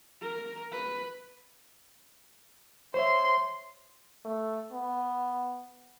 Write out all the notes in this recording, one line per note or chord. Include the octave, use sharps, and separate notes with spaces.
A#4
B4
C5 C#5 E5 C6
A3
B3